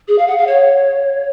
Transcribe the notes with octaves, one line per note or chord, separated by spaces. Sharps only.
G#4
F5
F#5
F5
C#5